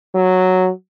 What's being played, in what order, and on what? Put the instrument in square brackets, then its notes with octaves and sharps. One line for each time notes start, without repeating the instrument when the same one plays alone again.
[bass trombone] F#3